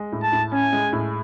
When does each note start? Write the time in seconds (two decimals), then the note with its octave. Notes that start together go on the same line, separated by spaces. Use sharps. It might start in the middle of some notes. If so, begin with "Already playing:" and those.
Already playing: G#3
0.12 A2
0.23 A5
0.32 A2
0.52 C#4 G#5
0.73 G#3
0.92 A2